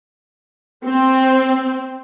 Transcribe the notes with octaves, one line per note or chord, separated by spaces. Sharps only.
C4